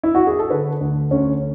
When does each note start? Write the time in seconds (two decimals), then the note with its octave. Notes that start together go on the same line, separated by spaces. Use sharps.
0.03 E4
0.15 F#4
0.27 G#4
0.39 A4
0.50 D3 B4
0.81 D2
1.11 D2 C#4